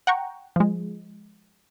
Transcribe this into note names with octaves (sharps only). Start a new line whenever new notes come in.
F#5 G5 A#5 C#6
F3 G#3